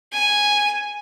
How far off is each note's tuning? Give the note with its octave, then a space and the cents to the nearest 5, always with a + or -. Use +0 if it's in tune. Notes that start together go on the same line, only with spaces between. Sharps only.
G#5 -5